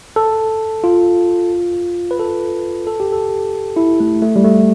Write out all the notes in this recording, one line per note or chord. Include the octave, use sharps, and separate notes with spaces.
A4
F4
B4
A4
A4
G4
A4
E4
A3
A3
G3
A3